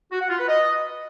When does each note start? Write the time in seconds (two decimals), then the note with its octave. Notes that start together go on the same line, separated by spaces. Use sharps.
0.11 F#4
0.20 F#5
0.29 F4
0.38 B4
0.47 D#5